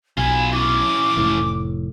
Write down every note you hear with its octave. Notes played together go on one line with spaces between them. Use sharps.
B1 F4 G#5 B5
E3 C#4 D6
F1 A2